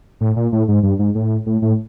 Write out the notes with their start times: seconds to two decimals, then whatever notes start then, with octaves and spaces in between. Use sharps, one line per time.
0.21 A2
0.36 A#2
0.52 A2
0.68 G#2
0.83 G2
0.99 G#2
1.15 A2
1.46 A2
1.62 A2